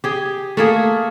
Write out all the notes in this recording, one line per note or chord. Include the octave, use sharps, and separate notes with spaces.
G4 G#4
A3 A#3 G#4